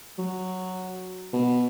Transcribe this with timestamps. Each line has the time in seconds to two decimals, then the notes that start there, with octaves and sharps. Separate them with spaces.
0.18 F#3
1.33 B2